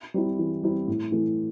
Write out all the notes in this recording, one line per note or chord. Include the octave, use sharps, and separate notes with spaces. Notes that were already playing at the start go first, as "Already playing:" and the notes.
G3 C4 E4
E3
G3 C4 E4
A2
E3 A3